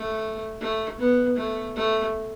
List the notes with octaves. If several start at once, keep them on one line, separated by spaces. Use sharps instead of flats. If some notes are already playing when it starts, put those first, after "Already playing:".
Already playing: A3
A3
B3
A3
A3